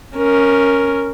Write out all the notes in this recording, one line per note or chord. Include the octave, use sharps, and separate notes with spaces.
C#4 A#4